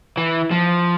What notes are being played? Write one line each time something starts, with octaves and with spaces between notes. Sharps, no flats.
E3
F3